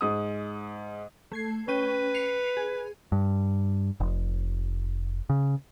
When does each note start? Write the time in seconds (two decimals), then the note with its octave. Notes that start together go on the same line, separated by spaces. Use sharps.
0.01 G#2 D#6
1.32 A3 G#6 C7
1.68 C#4 B4 G5 D#7
2.14 C7 C#7 F7
2.57 G#4
3.12 G2
4.00 F1
5.30 C#3